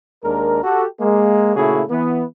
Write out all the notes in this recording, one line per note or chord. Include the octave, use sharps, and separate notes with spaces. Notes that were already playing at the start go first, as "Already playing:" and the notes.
D#2 G#3 D4 A#4
F#4 G4 A4
G#3 A#3
A#2 C#3 A3 E4 F#4 G#4
E3 B3